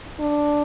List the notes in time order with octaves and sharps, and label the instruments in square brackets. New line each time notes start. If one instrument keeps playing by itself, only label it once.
[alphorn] D4